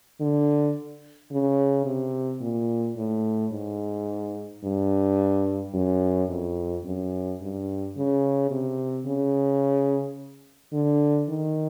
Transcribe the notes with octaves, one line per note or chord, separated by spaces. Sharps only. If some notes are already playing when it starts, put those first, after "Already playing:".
D3
C#3
C3
A#2
A2
G#2
G2
F#2
F2
F#2
G2
C#3
C3
C#3
D3
D#3